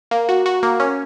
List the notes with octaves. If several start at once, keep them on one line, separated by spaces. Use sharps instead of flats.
A#3
F#4
F#4
A#3
C#4